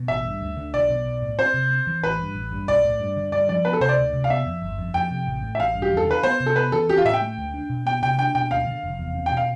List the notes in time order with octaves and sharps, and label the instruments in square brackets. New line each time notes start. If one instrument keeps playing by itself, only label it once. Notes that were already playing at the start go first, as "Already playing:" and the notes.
Already playing: [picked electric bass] B2
[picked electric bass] A1 [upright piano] E5
[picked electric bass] G2
D2
D3
[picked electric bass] B1 [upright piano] D5
[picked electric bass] B2
B1
A2
[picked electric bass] C4 [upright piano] C5
[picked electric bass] C3
C4
E3
[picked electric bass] A1 [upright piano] B4
[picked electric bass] G2
A1
G2
[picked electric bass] B1 [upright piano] D5
[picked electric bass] A2
G2
D3
[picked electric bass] G2 [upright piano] D5
[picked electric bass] F3 [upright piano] D5
[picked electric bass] B3 [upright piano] B4
[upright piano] A4
[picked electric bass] C3 [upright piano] C5
[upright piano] D5
[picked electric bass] D2
C3
[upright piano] F5
[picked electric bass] B3 [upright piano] E5
[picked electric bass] F2
G1
F2
[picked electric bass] F2 [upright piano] G5
[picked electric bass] C3
A1
A2
[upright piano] E5
[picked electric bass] A1 [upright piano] F5
[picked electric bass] G2
[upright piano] G4
[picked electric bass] E2
[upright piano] A4
[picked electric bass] D3 [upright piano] B4
[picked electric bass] B3 [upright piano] C5
[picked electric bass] C3
[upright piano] A4
[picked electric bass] B3 [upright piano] B4
[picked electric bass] E3 [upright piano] A4
[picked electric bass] C4 [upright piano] G4
[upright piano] F4
[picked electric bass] A2 [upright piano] E5
[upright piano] G5
[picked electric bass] A3
D2
D4
B2
[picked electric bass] B3 [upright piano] G5
[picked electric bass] C3 [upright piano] G5
[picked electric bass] D4 [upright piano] G5
[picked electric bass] B2 [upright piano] G5
[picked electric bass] D2 [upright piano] F5
[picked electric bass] D3
F1
E2
C4
[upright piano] G5
[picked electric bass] B2
[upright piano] F5